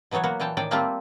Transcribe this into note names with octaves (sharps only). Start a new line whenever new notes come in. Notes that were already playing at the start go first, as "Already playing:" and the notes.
B2 E3 F#3 B3 C#5
A#3 B3 F#4
A#2 E3 G5 A5
A2 D#3 D5 G5
G3 A3 A#3 C4 F4 G4